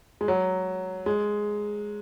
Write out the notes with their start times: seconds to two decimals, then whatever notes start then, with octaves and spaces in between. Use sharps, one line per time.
0.21 G#3
0.28 F#3
1.06 G#3